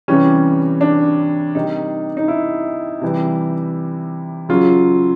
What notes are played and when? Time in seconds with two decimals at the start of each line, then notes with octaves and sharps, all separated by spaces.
0.08 C3 E3 G3 C#4
0.81 D4
1.55 C3 D#3 G3 D#4
2.17 D#4
2.28 E4
3.02 C3 E3 G3
4.49 C#3 F#3 F4